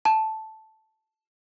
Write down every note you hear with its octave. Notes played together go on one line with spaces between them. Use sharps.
A5